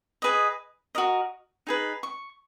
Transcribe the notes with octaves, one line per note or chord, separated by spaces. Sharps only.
G#4 B4 D#5
F#4 A#4 D#5
D#4 G#4 B4
C#6